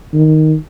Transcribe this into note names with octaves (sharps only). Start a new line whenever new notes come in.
D#3